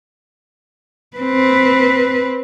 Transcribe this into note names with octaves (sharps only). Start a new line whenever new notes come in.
C4 B4